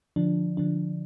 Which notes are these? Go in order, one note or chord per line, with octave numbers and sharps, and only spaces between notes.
D3 F3 D4
D3 F3 D4